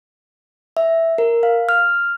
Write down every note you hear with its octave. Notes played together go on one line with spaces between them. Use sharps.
E5
A#4
F5
F6